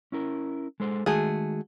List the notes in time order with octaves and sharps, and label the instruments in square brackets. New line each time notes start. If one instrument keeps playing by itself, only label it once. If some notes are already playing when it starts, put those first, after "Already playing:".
[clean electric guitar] C#4 E4 A#4
G#3 A4 C5
[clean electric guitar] D#3 G#3 [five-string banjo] A3 F#4 G#4